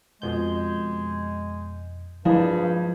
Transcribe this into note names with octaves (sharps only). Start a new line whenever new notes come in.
F2 B2 G#3 G6
G2 F3 F#3 G#3 A#3 E4 F5